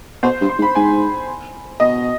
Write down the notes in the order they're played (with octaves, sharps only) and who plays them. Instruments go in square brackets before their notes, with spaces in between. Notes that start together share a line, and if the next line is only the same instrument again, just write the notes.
[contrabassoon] B2 [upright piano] C5
[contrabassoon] G2
[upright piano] C6
[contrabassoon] G#2
[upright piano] B5
[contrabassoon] G#2 [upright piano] G#5
[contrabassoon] B2 [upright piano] D#5